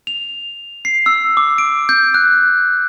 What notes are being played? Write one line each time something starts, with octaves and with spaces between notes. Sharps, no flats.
F7
C7
E6
D6
D7
G6
F#6